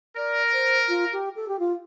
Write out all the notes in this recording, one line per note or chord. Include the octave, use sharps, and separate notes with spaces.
A#4 D5
C5
F4
G4
A4
G4
F4